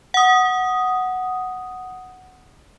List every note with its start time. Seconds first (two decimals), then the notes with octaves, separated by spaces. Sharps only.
0.14 F#5 D#6